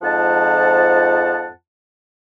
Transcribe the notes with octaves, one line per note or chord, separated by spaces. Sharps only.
F2 G#2 F3 F#5 A5